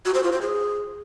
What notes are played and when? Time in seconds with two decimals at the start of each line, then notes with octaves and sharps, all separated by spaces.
0.05 F#4
0.14 C5
0.23 F4
0.32 C5
0.41 G#4